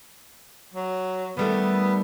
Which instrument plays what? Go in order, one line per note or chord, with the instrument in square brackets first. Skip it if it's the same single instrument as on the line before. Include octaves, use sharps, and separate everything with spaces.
[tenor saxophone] F#3
[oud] D#3 G3 A3 [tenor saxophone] B3